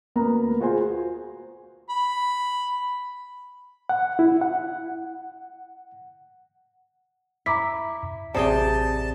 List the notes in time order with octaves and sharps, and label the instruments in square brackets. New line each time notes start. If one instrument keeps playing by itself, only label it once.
[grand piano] D2 A#3 B3 A#5
F4 F#4 G#4 C5 G#5 C6
[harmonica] B5
[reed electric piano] F#5
E4
F#5
[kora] E4 [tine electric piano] A#5 D6 B6
[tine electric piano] A1 D5 [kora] C3 G#4 G5 [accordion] A5